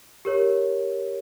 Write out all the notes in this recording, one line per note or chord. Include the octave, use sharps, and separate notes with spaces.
G4 A#4 C#5